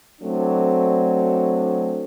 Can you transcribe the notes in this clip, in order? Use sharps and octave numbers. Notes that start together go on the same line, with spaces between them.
F#3 A3 C4 D4